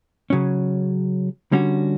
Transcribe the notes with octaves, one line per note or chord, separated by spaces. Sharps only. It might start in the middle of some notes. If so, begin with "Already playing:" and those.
C#3 F#3 C#4
D3 G3 C#4 F#4